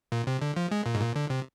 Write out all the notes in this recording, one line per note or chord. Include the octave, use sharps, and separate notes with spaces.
A#2
C3
D3
F3
G#3
A#2
G#2
A#2
D3
C3